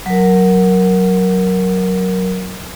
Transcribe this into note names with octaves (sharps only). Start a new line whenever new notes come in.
F#3 A#4